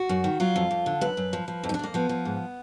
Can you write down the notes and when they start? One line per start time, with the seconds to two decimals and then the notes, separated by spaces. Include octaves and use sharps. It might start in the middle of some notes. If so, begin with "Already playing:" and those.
Already playing: F#4
0.09 F#2
0.24 D#3
0.40 F#3 F4
0.56 F2
0.71 F2
0.86 D3
1.01 F#2 B4
1.17 F#2
1.33 F3
1.48 F3
1.64 F2
1.69 D#4
1.74 D4
1.79 F2 A#3
1.94 F3 B3
2.09 F3
2.25 G#2